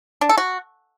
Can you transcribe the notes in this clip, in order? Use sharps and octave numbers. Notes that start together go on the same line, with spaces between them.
D4
A4
F#4